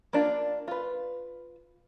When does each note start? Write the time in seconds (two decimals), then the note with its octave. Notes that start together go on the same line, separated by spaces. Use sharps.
0.13 A#3 D4 F4
0.68 F4 B4